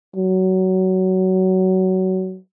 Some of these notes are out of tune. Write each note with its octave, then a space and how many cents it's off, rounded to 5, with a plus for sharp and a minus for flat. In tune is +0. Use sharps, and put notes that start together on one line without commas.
F#3 +20